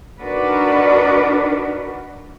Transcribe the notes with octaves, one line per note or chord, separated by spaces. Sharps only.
D4 D#4 F#4 A#4 B4 D5